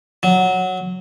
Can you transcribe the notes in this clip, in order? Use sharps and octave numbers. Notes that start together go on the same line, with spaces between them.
F#3